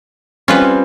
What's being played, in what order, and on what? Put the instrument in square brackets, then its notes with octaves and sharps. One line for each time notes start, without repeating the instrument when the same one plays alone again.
[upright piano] G3 C4 [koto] C#4 F4 B4